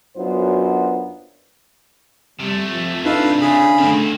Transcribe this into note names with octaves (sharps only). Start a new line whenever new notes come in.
F#2 F#3 B3 D4 F4 C5
C3 G3 A3
F3
D4 D#4 F4 A4 B4 F5
C#3 G#4 B5
D3 D#3 A3 C4